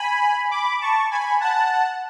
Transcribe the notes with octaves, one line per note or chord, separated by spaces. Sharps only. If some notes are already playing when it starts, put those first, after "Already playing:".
Already playing: G#5 B5
B5 D6
A5 C#6
G#5 B5
F#5 A5